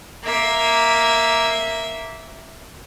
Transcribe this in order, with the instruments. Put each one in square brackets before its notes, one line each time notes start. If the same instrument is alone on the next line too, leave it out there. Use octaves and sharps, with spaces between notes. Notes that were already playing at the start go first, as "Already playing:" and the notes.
[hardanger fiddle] A#3 E5